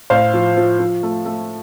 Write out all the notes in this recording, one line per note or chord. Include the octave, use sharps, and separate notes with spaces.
A2 C5 F5
F3
F3
F3
A3
A3